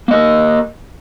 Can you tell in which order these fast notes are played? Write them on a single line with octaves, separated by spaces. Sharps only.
A#3 D#5 A#4